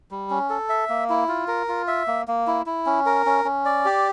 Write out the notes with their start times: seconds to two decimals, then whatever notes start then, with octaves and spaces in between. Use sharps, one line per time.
0.11 G3
0.30 C#4
0.50 A4
0.69 E5
0.89 A#3
1.10 E4
1.28 F4
1.48 A#4
1.68 F4
1.88 E5
2.07 A#3
2.28 A#3
2.47 E4
2.66 E4
2.86 C#4
3.06 A#4
3.26 C#4
3.45 C#4
3.65 D5
3.85 G4